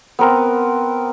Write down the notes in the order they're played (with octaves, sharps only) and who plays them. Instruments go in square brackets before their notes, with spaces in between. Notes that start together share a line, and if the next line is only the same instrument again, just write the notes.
[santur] B3 C4 A#4